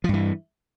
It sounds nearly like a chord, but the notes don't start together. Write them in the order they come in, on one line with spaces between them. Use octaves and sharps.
F3 G2 E3